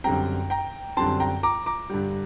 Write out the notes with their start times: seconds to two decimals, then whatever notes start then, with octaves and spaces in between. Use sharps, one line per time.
0.04 F#2 D3 G3 C4 G5 A#5
0.50 G5 A#5
0.97 F#2 D3 G3 C4 A5 C6
1.20 G5 A#5
1.43 A#5 D6
1.66 A#5 D6
1.90 G2 D3 G3